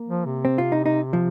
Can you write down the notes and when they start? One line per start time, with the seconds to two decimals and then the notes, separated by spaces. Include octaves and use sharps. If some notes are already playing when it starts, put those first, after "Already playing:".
Already playing: A#3
0.08 F3
0.26 C3
0.45 C4
0.58 F4
0.72 D#4
0.86 D#4
1.13 F3